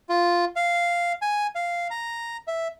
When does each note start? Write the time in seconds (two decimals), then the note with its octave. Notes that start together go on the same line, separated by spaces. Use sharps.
0.09 F4
0.56 F5
1.22 G#5
1.55 F5
1.90 A#5
2.48 E5